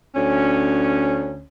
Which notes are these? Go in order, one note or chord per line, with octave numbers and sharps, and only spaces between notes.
D2 C#4